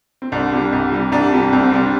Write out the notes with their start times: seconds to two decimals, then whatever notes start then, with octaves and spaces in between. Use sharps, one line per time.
0.22 C4
0.32 C2 D4
0.52 C3 G3
0.72 C2
0.92 C3 G3
1.12 C2 D4
1.32 C3 G3 D4
1.53 C2 C4
1.63 C4
1.72 C3 G3 D4
1.83 D4